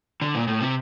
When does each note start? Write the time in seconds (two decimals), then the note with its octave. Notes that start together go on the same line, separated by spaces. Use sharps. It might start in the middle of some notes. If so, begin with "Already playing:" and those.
0.21 D3
0.35 A#2
0.48 A2
0.60 C3